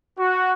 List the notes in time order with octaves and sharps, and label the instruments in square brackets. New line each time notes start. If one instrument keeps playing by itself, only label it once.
[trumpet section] F#4